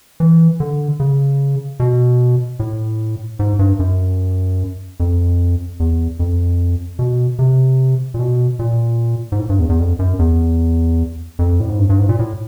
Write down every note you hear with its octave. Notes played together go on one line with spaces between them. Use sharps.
E3
D3
C#3
B2
A2
G#2
G2
F#2
F2
E2
F2
B2
C3
A#2
B2
A#2
G#2
A2
G2
E2
E2
F2
F#2
E2
F2
A2
G#2
G2
G2
G#2
A#2
A2